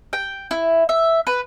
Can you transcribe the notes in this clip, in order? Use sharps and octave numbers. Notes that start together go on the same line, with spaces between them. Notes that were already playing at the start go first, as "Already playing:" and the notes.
G5
E4
E5
B4